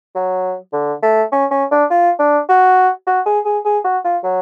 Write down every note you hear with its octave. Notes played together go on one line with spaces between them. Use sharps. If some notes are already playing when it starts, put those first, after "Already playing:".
F#3
D3
A3
C#4
C#4
D4
F4
D4
F#4
F#4
G#4
G#4
G#4
F#4
F4
F#3